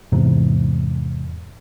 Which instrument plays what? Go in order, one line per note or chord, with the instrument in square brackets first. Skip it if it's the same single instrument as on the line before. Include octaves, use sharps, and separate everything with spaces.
[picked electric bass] E2 G#2 C3